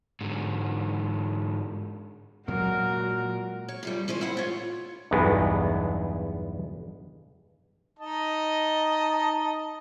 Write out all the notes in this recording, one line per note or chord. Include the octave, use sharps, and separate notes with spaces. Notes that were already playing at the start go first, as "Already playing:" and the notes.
G#2 D3
A#2 F#3 G#3 F#4 A#4
C#5
F#2 F3 G3
E3 G#3 C#4 C5
E2 E4 F#5
F4 C#5
B1 E2 G2 G#3 B3
D#4 D#5 A5